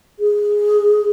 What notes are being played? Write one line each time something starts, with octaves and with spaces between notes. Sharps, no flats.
G#4